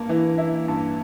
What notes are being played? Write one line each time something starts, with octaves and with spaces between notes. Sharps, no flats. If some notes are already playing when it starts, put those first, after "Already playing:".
Already playing: G2 A#3
E3
E4
G2